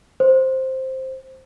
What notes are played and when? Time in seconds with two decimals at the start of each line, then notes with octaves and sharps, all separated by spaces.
0.20 C5